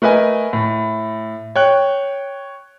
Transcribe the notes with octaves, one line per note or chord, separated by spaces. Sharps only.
A3 A#4 B4 D#5 G#5
A2
C#5 G5 F#6